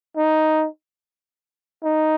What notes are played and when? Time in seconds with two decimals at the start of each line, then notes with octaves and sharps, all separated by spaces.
0.17 D#4
1.84 D#4